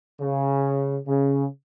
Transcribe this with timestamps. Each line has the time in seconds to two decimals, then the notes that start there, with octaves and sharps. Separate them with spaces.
0.21 C#3
1.07 C#3